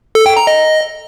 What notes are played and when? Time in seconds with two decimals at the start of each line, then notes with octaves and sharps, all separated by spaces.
0.15 A4
0.26 G5
0.37 A#5
0.47 D#5